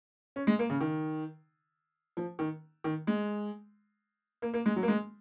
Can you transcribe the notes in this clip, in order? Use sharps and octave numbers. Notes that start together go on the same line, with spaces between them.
C#4
G#3
A#3
C#3
D#3
F3
D#3
D#3
G#3
A#3
A#3
G#3
F#3
A#3
G#3